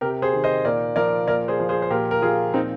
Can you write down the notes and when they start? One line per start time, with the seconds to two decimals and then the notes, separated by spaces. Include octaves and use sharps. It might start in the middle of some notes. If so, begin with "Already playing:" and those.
0.01 C3 G4 A#4
0.22 G#4 C5
0.33 D#3
0.44 C5 D#5
0.65 A#2 A#4 D5
0.96 F3 A#4 D5
1.28 A#2 A#4 D5
1.48 G#4 C5
1.60 F3
1.69 G#4 C5
1.82 C5
1.90 A#2 G4 A#4
2.11 A#4
2.22 F3 F4 G#4
2.54 A#2 C4 D#4